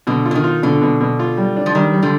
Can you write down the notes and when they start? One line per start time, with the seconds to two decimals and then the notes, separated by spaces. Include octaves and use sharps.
0.07 B2 D3
0.25 F4
0.31 D3
0.35 D#3
0.44 F4
0.63 B2 D3
0.82 B2
1.00 B2
1.19 F4
1.37 G3
1.57 D4
1.66 F3
1.75 D#3 G3
1.93 G3
2.02 D3 F3